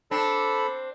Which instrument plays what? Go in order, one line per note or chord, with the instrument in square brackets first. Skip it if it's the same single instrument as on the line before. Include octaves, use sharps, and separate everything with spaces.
[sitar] C4 D4 [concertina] A4 B5